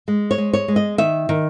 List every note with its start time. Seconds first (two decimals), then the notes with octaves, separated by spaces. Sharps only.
0.08 G#3
0.31 C#5
0.38 G#3
0.53 C#5
0.68 G#3
0.76 D#5
0.98 D#3 E5
1.29 D#3